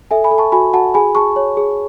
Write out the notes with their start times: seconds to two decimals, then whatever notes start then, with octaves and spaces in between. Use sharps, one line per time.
0.11 A4 E5 G#5
0.24 G#5 B5
0.31 A4
0.38 A5 C#6
0.52 F#4 G#5 B5
0.73 F#4 F#5 A5
0.94 G#4 G#5 B5
1.15 G#4 A5 C#6
1.36 C#5
1.57 G#4